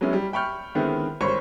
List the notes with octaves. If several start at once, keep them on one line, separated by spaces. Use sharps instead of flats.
F#3 G#3 B3 C#4 E4
G3
E5 G5 B5 C#6 F6 G6
D3 D#3 G#3 B3 C4 E4
G#1 G3 C5 C#5 B5 C#6